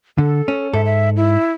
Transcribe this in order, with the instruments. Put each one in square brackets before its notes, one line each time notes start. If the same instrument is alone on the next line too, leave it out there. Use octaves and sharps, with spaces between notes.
[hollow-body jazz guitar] D3 [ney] A4
[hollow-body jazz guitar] C#4
[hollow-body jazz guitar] G#2 A4 [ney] E5
[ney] E5
E4